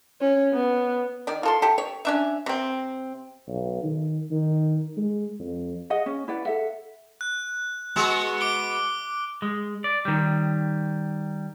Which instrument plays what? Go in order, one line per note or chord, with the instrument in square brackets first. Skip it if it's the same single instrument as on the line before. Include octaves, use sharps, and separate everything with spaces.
[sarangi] C#4
B3
[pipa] D#3 D5
F4 A4 C6
G4 A4
C#5
C#4 D4 E5
C3 C4
[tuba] B1
D#3
D#3
G#3
F2
[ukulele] G#4 D#5 F#5
C#4
E4 B4 D5 F#5
A4 E5 F#5
[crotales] F#6
[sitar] G#3 B3 F#4
[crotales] D6 D7 G7
[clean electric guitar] G#3
D5
D#3 G3